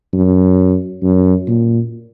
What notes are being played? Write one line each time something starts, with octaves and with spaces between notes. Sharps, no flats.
F#2
F#2
A#2